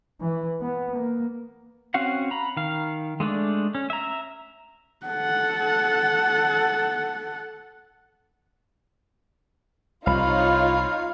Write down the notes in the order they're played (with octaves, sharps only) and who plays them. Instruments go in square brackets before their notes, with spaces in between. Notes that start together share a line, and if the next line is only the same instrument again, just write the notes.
[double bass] E3
B3
A#3
[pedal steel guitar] C4 C#4 F#4 F5 F#5
A#5 B5
D#3 F5
G#3 A3 D4 D5
C#4
E5 A#5
[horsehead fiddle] A4 F#5
[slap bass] C2 [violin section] D#4 F4 C#5 [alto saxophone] F5 [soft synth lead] B5